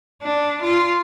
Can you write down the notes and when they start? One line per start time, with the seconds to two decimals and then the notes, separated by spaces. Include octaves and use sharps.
0.22 D4
0.63 F4